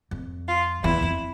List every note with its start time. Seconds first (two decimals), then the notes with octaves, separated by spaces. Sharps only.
0.11 F2
0.48 F4
0.84 E2 E4
1.03 F2